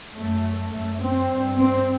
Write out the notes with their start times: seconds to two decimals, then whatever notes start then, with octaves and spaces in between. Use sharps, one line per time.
0.15 F#2 A3
0.72 F#2 A3
1.01 C4
1.30 G2
1.58 C4